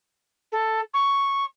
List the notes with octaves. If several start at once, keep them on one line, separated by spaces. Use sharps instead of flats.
A4
C#6